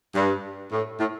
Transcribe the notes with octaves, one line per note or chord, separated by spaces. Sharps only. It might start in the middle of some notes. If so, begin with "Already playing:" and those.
G2
A2
A2